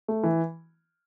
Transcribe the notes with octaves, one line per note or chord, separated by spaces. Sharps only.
A3
E3